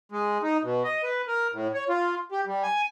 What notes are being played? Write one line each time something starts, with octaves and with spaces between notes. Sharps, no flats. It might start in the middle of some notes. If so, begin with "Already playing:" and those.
G#3
D#4
B2
D#5
B4
A#4
A2
C#5
F4
G4
G3
G#5